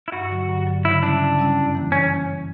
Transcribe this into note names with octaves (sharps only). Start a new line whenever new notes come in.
E4
G2 F#4
D3 F#3
G2
D3 F#3
C#3 E4
G3 C#4 D4 E4
C#3
G3 C#4 E4
F#2
E3 A#3
C#4